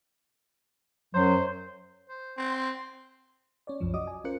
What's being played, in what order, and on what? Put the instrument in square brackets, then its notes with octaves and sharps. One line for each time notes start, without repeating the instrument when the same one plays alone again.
[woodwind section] F#2 F#3 [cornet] C5
[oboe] C5
[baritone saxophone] C4
[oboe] C6
[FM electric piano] C#4 C#5 D5
C2 F#2 F3
F#4 D5 D#5 D6 D#6
G#5
C#4 F4 A#4 C5 F#6 C#7